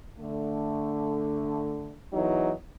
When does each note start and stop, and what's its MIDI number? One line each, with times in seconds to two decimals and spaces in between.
0.18 1.95 50
0.18 1.95 57
2.13 2.52 40
2.13 2.52 52
2.13 2.52 54
2.13 2.52 63